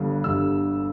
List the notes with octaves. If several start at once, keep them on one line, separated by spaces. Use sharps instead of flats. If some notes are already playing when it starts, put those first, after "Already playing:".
Already playing: G1 G2 D3
G1 G2 D3 E6